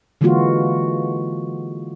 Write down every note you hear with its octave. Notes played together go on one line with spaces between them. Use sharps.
D3 E3 G#3 A#3 F4 F#4